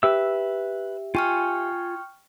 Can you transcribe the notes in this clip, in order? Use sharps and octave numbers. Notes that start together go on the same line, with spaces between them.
G4 B4 E5 E6
F4 G5 G#5 C#6 F6